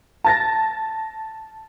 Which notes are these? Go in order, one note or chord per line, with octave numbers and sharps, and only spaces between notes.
A5 A6 A#6